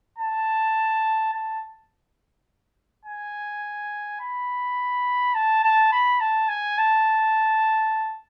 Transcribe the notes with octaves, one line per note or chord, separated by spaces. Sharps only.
A5
A5
G#5
B5
A5
A5
B5
A5
G#5
A5